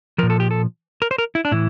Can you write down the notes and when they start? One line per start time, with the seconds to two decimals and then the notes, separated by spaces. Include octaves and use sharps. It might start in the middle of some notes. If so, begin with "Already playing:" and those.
0.18 A#2 F3 A#4
0.30 A4
0.40 G4
0.51 A4
1.02 A#4
1.11 C5
1.18 A#4
1.35 E4
1.45 D4
1.51 A2 E3 E4